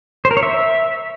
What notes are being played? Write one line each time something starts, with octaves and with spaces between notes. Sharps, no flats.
C5
A#4
C#5
E5